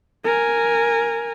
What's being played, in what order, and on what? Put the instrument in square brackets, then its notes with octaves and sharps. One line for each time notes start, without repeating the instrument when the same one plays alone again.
[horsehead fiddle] A#4 G#5